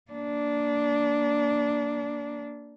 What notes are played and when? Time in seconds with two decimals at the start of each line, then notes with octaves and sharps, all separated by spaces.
0.12 A#3 D4